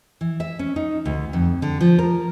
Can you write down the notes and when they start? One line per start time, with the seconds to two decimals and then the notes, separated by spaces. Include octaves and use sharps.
0.21 E3
0.40 E5
0.59 C#4
0.76 D#4
1.05 D2
1.33 F2
1.62 D3
1.81 F3
1.99 A#4